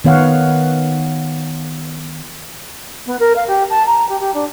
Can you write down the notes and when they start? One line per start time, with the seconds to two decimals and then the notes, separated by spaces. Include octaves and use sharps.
0.04 D#3 B3 C#5 F5 F#5
3.06 B3
3.19 A#4
3.36 F5
3.47 G4
3.70 A5
3.87 A#5
4.09 G4
4.20 G4
4.34 D4